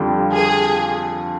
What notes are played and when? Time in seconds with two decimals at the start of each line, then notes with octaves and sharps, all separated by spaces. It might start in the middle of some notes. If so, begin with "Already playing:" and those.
Already playing: F2 D3 G3 D4 F4
0.33 G#4